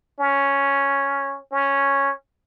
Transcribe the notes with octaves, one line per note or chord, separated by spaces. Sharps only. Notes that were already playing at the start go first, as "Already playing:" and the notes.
C#4
C#4